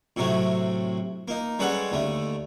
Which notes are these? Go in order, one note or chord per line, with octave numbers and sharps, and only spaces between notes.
A2 C3 F#3 A3
A#3 D#4
G3 G#3 C#4 A4 B4 F#5
D#2 D3 A3